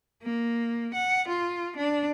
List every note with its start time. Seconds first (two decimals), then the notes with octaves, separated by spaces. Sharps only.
0.23 A#3
0.95 F#5
1.28 F4
1.76 D4